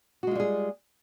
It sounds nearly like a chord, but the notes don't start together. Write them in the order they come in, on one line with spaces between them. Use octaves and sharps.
F#4 G#3 F4 G3 G#4